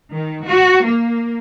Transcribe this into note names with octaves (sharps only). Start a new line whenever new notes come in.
D#3
F#4
A#3